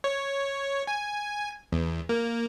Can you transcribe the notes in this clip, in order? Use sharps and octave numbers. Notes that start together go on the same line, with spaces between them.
C#5
G#5
E2
A#3